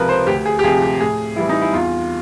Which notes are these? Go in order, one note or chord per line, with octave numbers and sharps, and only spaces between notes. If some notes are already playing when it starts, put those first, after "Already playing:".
Already playing: C#2 C3 F3 A#4 B4
C5
D2 G4
G#4
G4
C3 F3 G#4
G4
A2 G#4
E3 G3 E4
D#4
E4
E2 F4